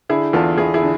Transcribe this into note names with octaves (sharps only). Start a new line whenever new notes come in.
D3 E4 G#4
E2 F4 A4
E2 E4 G#4
E4 G#4
D3